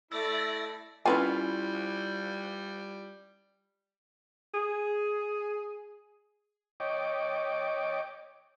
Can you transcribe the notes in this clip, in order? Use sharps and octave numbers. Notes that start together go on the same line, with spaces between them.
A3 E4 D5 E5 A6 A#6
G3 C#4 E4 F4 A#4 B4 G#5
G#4
C#5 D#5 G5 D6